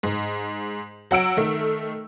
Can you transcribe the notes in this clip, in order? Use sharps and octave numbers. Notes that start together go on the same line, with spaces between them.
G#2
F#3 F#5 E6 D7
D#3 A3